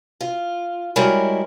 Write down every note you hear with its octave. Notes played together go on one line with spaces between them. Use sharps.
F4
G3 G#3 E4 F#4 A#4 C#5